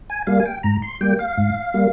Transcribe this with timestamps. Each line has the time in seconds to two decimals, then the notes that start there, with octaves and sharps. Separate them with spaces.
0.10 G#5
0.27 G3 A#3 F5
0.40 G#5
0.45 G5
0.63 G#2 A#5
0.82 C6
1.01 G3 A#3 G5
1.19 F5
1.38 G#2
1.74 G3 A#3